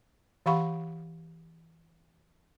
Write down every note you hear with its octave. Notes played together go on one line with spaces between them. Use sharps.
E3 G4 F5 F#5 B5 C#6